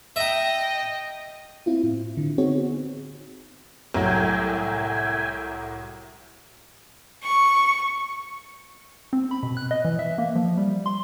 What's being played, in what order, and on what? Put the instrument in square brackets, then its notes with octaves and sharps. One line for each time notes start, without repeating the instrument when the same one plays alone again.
[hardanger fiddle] D#5 G5 [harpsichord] E5 A#5
[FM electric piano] C4 E4 F4
A2
D3
B3 C4 D#4 F#4 G#4 C#5
[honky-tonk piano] C2 A2 F#3 [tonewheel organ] E5 G5 G#5
[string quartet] C#6
[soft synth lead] C4
B5
B2
F#6
D#5
E3
E5
A#3
F3
G3
C6